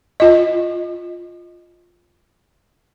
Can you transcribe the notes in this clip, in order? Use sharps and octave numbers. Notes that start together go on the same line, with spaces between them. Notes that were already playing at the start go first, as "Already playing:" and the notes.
F4 D#5